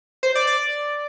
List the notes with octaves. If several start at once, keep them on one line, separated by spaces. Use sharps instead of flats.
C5
D5
D5